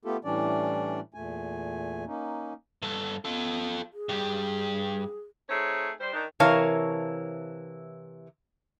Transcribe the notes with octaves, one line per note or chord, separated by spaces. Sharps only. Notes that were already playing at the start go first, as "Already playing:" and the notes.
A3 B3 F4 G4 A4
A2 E3 G3 C#4 D4 D5
E2 A#2 A3 G#5
A#3 C#4 D#4
G2 A4
B3 F4 A4
G#4
G2 G4
A3 C4 D#4 G#4 C#5
G3 C5
D#3 D4 D#4
C3 E3 A#4 C#5 F5 A5